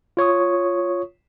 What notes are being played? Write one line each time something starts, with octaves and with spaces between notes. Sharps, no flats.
F4 C#5 C#6 D#6